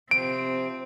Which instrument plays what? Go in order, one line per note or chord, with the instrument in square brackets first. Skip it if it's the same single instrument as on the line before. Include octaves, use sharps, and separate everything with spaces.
[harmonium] C3 F3 [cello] C4 [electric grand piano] D7